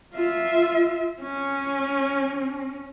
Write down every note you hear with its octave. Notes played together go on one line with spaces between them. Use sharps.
F4 E5
C#4